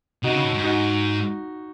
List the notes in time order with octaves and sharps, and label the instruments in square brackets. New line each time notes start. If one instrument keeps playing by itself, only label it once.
[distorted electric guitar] C3 [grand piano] D#4 F#4
[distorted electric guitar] C#3
A2
G#2
[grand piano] D#4 F#4